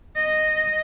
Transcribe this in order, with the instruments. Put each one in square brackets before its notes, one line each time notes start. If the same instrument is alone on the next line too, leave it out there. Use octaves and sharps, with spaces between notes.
[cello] D#5